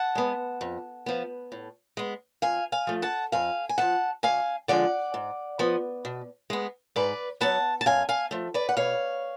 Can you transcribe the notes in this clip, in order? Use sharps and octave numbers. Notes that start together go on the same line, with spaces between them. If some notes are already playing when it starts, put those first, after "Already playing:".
Already playing: F#5 A5
G#3 B3
F2
F3 B3
A2
G#3 B3
F2 F5 G#5
F5 G#5
F3 A3
F#5 A5
F2 F5 G#5
G#5
C#3 F3 F#5 A5
D2 F5 G#5
D3 F3 G#3 D5 F#5
G#2
F3 B3
B2
G#3 B3
G#2 B4 D5
F#3 B3 F#5 A5
A5
F#2 F5 G#5
F5 G#5
F3 A3
B4 D5
F#5
B2 C#5 F5